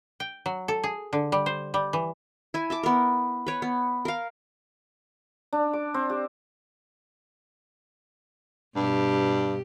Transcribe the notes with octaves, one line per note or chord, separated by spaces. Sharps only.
G5
F#3
A4
G#4
D3
G3
C5
G3
E3
E4 G#5
E5 A5 D6
B3 A#4
B4 C#5
B3
A#4 F5
D4
D6
C4
G4
G2 B2 G4